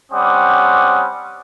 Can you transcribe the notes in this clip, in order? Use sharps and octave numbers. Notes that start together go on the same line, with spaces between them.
G3 C4 C#4 F#5 D6 D#6